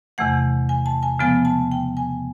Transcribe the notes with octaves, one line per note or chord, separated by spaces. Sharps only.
E2 C3 E3 A3 F#5
G#5
A5
G#5
C#3 F3 G#3 B3 G#5
A5
G5
G#5